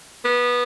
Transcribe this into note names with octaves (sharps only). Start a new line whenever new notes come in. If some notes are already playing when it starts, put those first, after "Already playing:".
B3